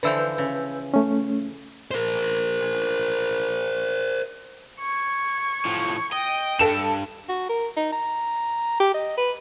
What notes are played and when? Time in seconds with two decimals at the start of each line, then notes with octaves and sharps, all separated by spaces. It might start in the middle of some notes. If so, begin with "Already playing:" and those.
0.03 D3 E3 F3 B4 E6 G6
0.38 C#3
0.94 A3 C#4
1.91 A#4 C5
4.80 C#6 G#6
5.65 A2 F3
6.13 D#5 G5
6.59 G2 A4 E7
7.29 F#4
7.49 A#4
7.77 D#4
7.93 A#5
8.80 G4
8.94 D#5
9.17 B4